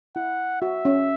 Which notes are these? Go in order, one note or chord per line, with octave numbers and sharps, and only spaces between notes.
E4 F#5
F#4 E5
C#4